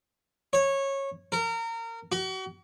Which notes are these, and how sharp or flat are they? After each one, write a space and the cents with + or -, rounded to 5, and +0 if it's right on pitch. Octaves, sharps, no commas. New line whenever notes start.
C#5 -15
A#4 -30
F#4 +40